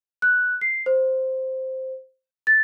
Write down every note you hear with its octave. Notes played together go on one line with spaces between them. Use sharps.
F#6
C7
C5
A6